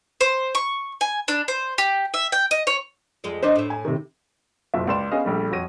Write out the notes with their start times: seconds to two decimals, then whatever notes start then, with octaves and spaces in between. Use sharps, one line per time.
0.21 C5
0.55 C#6
1.01 G#5
1.28 D4
1.48 C5
1.78 G4
2.14 E5
2.32 G5
2.51 D#5
2.67 C#5
3.24 F2 G#3 D5
3.43 D4 D#4 C5 D#5 E5
3.56 A2 E5
3.70 G#5
3.85 C3 D#3
4.74 F#1 B1 F4 E5
4.88 C#2 D5 C6 E7
5.11 B3 C#4 G#4 D#5 F5
5.25 A#1 G3 A3
5.51 F2 F#4 C#5 A#6 D#7